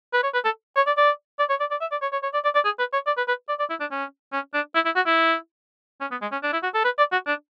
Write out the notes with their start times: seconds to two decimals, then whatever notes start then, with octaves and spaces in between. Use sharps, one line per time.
0.14 B4
0.24 C#5
0.34 B4
0.45 A4
0.76 C#5
0.87 D5
0.97 D5
1.39 D5
1.50 C#5
1.60 D5
1.71 D5
1.81 E5
1.91 D5
2.02 C#5
2.13 C#5
2.23 C#5
2.34 D5
2.44 D5
2.55 D5
2.65 G#4
2.79 B4
2.93 C#5
3.07 D5
3.17 B4
3.28 B4
3.49 D5
3.59 D5
3.70 E4
3.80 D4
3.92 C#4
4.33 C#4
4.54 D4
4.75 E4
4.85 E4
4.96 F#4
5.07 E4
6.01 C#4
6.11 B3
6.22 G#3
6.32 C#4
6.43 D4
6.53 E4
6.63 F#4
6.74 A4
6.85 B4
6.98 D5
7.12 F#4
7.27 D4